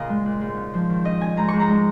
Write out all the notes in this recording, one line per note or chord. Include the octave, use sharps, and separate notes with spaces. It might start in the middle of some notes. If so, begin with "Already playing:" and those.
Already playing: A#2 C#3 D#5 F5 A#5
G#3
A#2
G#2
C#4
F3
D#3
C#4 D#5
C#4 G#5
G#2 A#5
G#2 C#6
A#5
G#3